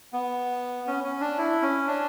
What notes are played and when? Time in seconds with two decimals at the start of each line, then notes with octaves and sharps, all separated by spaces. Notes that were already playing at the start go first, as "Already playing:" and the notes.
0.13 B3
0.87 C#4
1.04 C#4
1.21 D4
1.38 E4
1.62 C#4
1.88 D4